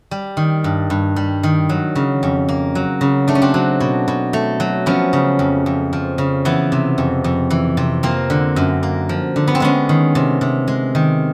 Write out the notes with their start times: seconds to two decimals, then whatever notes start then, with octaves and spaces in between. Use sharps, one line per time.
0.11 G3
0.37 D#3
0.64 G2
0.90 G2
1.16 G3
1.43 D#3
1.69 F#3
1.96 C#3
2.23 F2
2.49 A#3
2.75 F#3
3.01 C#3
3.28 A3 D4
3.35 C#4
3.42 C4 D4
3.54 F#3
3.80 B2
4.08 B2
4.33 A3
4.60 F#3
4.86 F3 B3 C#4
5.13 C#3
5.39 F2
5.66 F2
5.93 F3
6.18 C#3
6.45 E3 B3
6.72 C3
6.98 F2
7.24 F2
7.50 E3
7.77 C3
8.03 F3 A#3 C4
8.30 D3
8.56 F#2
8.83 A#3
9.09 F3
9.36 D3
9.48 B3
9.55 C4
9.60 G#3 B3 C#4
9.89 D#3
10.15 C3
10.41 C3
10.68 G#3
10.95 D#3